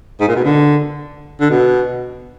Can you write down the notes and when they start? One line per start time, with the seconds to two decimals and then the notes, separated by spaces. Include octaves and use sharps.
0.20 G#2
0.28 A#2
0.36 B2
0.44 D3
1.40 D3
1.50 B2